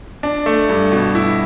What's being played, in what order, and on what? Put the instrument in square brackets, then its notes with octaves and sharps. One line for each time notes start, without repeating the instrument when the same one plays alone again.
[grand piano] D4
A3
G2
B2
E4